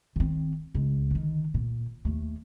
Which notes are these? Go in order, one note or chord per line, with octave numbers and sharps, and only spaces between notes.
D#3 C4
C#2
D3 D#3
A#2
D#2 A3